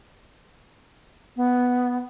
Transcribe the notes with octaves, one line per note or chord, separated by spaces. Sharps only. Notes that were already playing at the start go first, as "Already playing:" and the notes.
B3